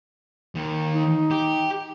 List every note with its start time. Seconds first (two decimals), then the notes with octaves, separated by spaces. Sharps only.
0.55 D#2 D#3
0.94 D#4
1.31 G4